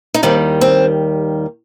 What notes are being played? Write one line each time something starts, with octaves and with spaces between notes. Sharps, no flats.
D#4
D#2 D#3 G3 C4
C4